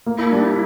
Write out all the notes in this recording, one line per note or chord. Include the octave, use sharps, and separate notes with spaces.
A#3
E4
G3 D4
E4